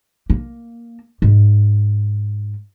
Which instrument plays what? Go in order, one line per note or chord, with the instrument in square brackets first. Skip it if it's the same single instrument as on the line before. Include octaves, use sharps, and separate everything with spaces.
[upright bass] A#3
G#2